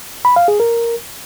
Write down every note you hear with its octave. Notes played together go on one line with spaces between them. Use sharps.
B5
F5
G#4
A#4